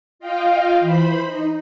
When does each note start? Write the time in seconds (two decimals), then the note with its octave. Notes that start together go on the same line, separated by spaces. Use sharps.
0.19 F4 D#5 F5 G5
0.80 E3 C5 B5
1.25 D#4